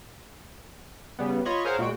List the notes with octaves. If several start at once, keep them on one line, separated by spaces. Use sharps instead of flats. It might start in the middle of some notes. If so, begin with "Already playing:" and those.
C#3 G3 B3
F4 C#5 D#5 B5 C#6
G#4 A#4 C5 C#5 F5 F#5
A#2 G#3 F#4 G5